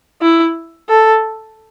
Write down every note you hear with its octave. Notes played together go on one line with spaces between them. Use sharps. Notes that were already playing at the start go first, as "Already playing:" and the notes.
E4
A4